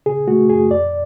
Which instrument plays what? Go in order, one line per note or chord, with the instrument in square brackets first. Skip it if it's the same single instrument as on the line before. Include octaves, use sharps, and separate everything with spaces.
[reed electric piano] C#3 G#4
A3 F#4
F#2 G#4
F2 D5